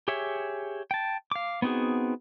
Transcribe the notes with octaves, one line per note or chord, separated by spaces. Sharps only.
G4 G#4 C#5 E5
G5 A5
F5 D6
B3 C4 D#4 F#4 G#4